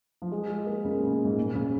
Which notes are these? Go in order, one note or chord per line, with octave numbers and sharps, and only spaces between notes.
F3
G#3
G#3
A#3
C#3
A#2
C#3
A#2
G#2
A#2
C#3